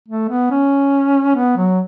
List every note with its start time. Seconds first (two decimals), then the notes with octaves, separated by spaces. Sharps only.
0.08 A3
0.30 B3
0.51 C#4
1.36 B3
1.57 F#3